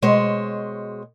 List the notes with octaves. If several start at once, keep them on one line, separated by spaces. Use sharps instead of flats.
B2 G#3 C5 C#5